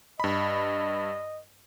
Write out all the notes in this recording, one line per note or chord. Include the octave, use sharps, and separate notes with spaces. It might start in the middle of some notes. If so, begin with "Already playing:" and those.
G2 D#5 B5